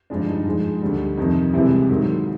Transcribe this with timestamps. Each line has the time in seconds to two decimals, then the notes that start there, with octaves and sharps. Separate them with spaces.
0.10 G2 D3 F3 G#3 D4
0.28 D#4
0.46 G#2 F3 G#3
0.82 D2 D3 G3
1.17 F2 C3 D#3 D#4
1.53 C2 C3 E3 G#3 E4
1.90 G#2 D#3 F#3